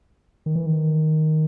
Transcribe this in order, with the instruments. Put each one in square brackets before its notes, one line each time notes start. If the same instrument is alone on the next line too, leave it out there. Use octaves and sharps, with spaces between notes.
[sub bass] D#3
E3
D#3